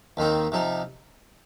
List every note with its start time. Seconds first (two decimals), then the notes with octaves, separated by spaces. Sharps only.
0.17 D#2 D#3 C4 D#4
0.52 C3 F3 D#4